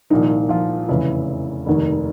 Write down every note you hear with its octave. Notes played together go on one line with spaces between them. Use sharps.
C2 A#2 D#3 F3 D#4
F3 F4
F1 E2 C#3 E3 E4
F1 D#2 D#3